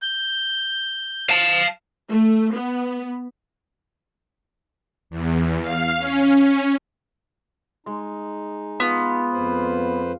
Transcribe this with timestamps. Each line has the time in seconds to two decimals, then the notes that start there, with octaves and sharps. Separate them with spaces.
0.02 G6
1.30 F5 A5
2.09 A3
2.53 B3
5.10 E2
5.61 F5
5.98 C#4
7.86 G#3 D#4
8.80 B3 F4
9.33 F2 B4 C5